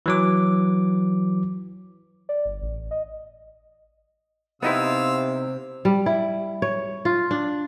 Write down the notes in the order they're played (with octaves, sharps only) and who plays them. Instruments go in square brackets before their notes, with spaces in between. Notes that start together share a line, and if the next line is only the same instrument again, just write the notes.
[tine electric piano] E3 F#3 D6
[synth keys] D5
G1
A1
D#5
[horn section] C3 [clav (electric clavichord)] B3 D#4 E4 [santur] C5 G5 [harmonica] F5 E6
[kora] G3
E4
C#5
F4
D4